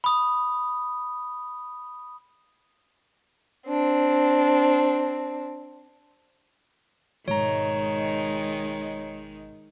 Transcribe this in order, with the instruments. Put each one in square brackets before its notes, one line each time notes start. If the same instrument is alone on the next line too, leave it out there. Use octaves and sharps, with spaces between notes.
[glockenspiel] B5 D#6
[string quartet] C4 D4
[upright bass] G#1 B2 [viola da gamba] D#3 G#3 [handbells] C#5 A#5